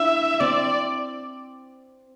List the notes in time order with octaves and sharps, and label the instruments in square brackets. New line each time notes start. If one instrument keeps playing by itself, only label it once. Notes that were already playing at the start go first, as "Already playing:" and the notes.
Already playing: [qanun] D4 E4 [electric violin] E5
[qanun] C4 [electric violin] D5